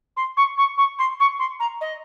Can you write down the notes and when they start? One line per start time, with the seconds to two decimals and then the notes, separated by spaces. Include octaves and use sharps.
0.16 C6
0.37 C#6
0.57 C#6
0.77 C#6
0.99 C6
1.20 C#6
1.39 C6
1.60 A#5
1.81 D#5